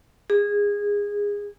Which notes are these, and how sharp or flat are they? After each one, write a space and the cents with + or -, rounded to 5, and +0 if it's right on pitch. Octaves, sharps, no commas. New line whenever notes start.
G#4 -20